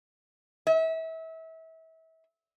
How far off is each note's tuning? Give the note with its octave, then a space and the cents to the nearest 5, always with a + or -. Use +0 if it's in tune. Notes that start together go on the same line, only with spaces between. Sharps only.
E5 -30